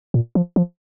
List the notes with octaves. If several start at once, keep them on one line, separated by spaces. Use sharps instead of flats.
A#2
F3
F3